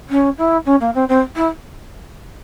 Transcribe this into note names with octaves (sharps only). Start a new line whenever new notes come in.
C#4
E4
C#4
A#3
C4
C4
E4